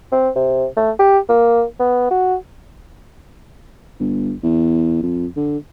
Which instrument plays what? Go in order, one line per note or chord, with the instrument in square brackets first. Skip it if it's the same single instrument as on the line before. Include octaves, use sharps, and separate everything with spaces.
[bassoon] C4
C3
A3
G4
A#3
B3
F#4
[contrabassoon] G1
E2
F2
D3